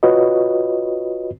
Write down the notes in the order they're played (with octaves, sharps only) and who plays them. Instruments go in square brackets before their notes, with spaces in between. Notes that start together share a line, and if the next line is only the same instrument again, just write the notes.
[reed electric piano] F4 F#4 B4 C#5 D#5